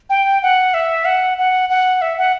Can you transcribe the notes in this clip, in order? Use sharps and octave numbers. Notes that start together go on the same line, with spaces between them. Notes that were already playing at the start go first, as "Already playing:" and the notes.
G5
F#5
E5
F#5
F#5
F#5
E5
F#5